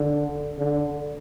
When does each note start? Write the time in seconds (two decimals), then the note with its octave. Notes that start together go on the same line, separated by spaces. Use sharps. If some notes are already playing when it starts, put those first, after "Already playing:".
Already playing: D3
0.58 D3